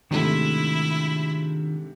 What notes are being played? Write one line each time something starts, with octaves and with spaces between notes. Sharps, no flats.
G#2 C3 D#3 A3 D4 E4 F4